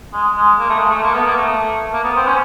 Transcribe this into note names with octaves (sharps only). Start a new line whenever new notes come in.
G#3
G#3
A#3
A3
G#3
A3
A#3
B3
A#3
A3
A#3
B3
C4
C#4